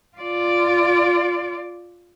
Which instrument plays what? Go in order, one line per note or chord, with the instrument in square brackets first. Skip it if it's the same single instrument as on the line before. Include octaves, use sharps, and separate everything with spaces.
[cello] F4 D5